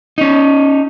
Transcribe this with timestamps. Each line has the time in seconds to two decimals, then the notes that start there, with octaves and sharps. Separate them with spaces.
0.18 C#4 D#4